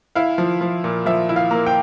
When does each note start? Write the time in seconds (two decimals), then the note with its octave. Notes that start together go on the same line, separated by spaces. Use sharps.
0.15 E4 F5
0.38 F3
0.61 F3
0.84 A#2
1.06 F3 E5
1.29 E4
1.36 F5
1.51 A#3
1.66 G5